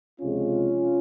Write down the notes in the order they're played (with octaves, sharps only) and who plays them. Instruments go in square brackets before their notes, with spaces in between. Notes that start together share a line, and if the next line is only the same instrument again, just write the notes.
[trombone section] C#2 C3 F3 G#3 C#4 F4